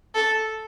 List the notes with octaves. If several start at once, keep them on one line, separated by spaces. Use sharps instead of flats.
A4